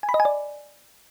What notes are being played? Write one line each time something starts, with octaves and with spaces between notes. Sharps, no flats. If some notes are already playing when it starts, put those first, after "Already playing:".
G#5
B5
D#5
G#5
D5